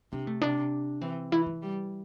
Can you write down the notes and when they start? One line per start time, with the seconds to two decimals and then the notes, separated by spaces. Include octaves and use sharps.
0.12 C3 D4
0.27 A3
0.42 C3 D4
1.01 E3 C4
1.32 E3 E4
1.46 E4
1.62 G3